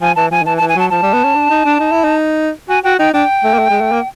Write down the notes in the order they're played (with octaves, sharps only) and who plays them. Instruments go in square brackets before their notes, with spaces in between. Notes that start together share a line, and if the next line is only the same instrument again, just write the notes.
[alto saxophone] F3 [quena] G#5
[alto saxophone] E3 [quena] A5
[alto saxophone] F3 [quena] G#5
[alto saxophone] D#3
[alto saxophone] E3 [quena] A5
[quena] A5
[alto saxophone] E3
[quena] G#5
[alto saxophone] F#3 [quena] A5
[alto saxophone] F3 [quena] A5
[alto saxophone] G3
B3
C#4
D4
D#4
D4
D#4
E4
D#4
[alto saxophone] F#4 [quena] G#5
[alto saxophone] F#4 [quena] G5
[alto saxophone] D#4 [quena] G5
[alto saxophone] D4 [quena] G5
[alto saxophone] A3
A#3
A3
G#3
A3
A#3